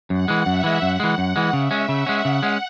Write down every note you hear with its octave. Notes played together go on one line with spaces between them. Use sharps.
F#2 F#5
E3 G#3
F#2 E5
E3 G#3
F#2 F#5
E3 G#3
F#2 F#5
E3 G#3
C#3 E5
G#3 C#4
C#3 F#5
G#3 C#4
C#3 F#5
G#3 C#4